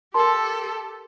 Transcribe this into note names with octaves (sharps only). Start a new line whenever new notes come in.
G4 A4 A#4 A5 C6